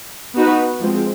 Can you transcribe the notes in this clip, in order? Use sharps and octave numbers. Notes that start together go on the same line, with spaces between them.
B3 D#4 F#4 B4
F3 G#3 C4